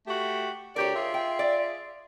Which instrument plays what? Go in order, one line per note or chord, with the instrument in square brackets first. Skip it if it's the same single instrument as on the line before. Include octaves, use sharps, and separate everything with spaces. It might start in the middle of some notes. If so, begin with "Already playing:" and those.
[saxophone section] A3 F#4 G4
[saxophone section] D2 G4 D5 [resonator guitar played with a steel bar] A#4 C#5
[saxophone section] F4 G#4 E5
[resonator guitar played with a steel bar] G5
D5